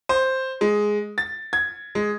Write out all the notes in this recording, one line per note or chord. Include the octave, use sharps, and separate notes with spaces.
C5
G#3
A6
G#6
G#3